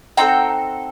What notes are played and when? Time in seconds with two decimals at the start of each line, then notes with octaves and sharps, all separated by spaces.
0.17 C4 D#4 F#4 A4 G5 A#5